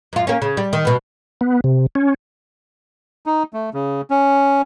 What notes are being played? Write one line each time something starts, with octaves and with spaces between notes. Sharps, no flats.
F#2 F4
A#3 C#4
C#3
G3
D#3
B2 B3
B3
C3
C#4
D#4
A3
C#3
C#4